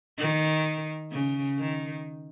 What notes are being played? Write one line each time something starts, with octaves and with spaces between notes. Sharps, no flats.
D#3
C#3
D#3